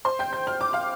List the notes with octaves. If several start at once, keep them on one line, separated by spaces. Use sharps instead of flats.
C5 C6
G5 G6
G6
F6
D6
F5 F6